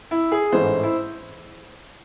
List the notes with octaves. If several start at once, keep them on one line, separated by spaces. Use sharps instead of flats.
E4
G#4
A1 G#2 E3 A3 C5
E4